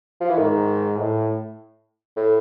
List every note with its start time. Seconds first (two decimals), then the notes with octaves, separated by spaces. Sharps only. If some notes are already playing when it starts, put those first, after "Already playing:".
0.21 F3
0.30 E3
0.38 G#2 D#3
0.98 A2
2.16 A2